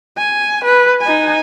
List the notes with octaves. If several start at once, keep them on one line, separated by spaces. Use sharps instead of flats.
G#5
B4
D#4 G#5